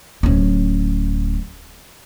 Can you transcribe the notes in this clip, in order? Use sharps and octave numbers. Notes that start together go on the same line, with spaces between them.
D1 C#4